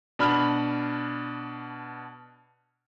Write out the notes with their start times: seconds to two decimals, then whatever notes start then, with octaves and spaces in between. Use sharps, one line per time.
0.19 B2 D4 B5 F6